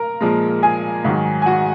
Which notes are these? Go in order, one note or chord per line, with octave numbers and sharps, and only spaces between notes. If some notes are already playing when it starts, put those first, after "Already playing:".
Already playing: A#4 A#5
A#2 F3 G#3
G#4 G#5
G#2 D#3 F#3
G#5
F#4 F#5